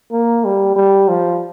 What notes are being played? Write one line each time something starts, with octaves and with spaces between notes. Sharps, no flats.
A#3
G3
G3
F3